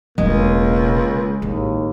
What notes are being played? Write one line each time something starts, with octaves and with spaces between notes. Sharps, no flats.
E1 C#2 B2 G#3 A#3
A1 D#2